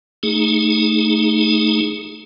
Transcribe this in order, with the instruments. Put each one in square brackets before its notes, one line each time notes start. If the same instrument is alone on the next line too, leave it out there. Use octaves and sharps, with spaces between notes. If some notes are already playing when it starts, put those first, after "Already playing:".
[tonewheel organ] A3 D#4 G#4